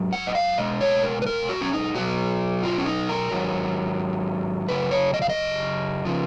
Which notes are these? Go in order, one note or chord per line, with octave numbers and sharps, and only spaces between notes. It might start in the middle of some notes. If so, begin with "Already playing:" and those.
Already playing: G#2 F#3
F#5
D#5
F5
B2 G#3 D#5
C#5
A#4
B4
A#4
F#4
C#4
D#4
B2 F#3 F#4
F4
C#4
D#4
A#4
G#2 D#3 F#3
F#2 C#3 B4
C#5
D#5
F5
D#5
C#3 F3